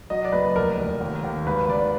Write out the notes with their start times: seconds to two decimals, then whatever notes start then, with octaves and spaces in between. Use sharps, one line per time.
0.10 F#3 D#5
0.25 D5
0.32 F#1 B4
0.55 F1 A#4
0.79 F1
1.01 D#2
1.24 D#2
1.46 G#1 B4
1.69 G#1 D5